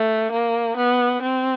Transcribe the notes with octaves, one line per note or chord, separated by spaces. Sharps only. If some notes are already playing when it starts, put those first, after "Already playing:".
Already playing: A3
A#3
B3
C4